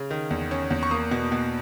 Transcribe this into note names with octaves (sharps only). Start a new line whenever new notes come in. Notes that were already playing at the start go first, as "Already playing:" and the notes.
Already playing: C#3
D#3
E2
C#4
E2
C#6
A#3 D#6
B2
B2